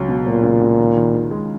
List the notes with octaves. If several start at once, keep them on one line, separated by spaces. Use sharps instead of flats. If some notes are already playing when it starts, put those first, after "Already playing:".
Already playing: C#2 F#3
B2
A#2 F#3
C#2
C#2
D#3
D#3
D#3
G#3